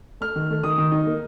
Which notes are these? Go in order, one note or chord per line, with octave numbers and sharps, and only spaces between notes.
A3 F6
D#3
A3
D#3 D#6
D#3
D#4
A#3